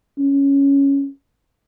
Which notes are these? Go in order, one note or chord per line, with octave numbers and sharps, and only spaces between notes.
C#4